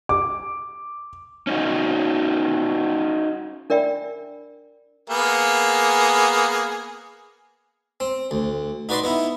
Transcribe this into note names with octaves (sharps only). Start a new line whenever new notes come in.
D6
C#4 D#4 F#4
D4 A#4 D5 E5 G5 B5
A#3 B3 G#4
C4
D2
D#4 F#4 B4 D5 D#5 C6
B3 D#4 E4